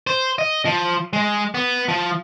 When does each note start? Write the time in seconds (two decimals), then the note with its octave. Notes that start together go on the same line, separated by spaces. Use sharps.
0.07 C5
0.39 D#5
0.66 F3
1.13 G#3
1.55 B3
1.89 F3